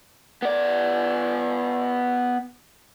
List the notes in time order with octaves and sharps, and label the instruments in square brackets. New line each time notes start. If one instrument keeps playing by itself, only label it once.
[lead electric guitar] B3 D5